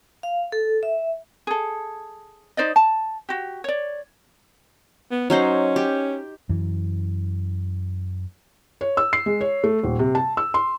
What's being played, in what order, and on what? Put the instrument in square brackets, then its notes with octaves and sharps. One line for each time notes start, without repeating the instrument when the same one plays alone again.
[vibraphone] F5
A4
E5
[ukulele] G#4 A4
D#4 C5 D5 D#5
A5
F#4 G4
C#5 D5
[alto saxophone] B3
[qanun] F#3 D#4 C5 [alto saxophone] C#4
[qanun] G4
[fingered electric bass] F#2 E3
[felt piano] C#5
E6
C7
G#3
C#5
A3
D#1
C3
A5
E6
C6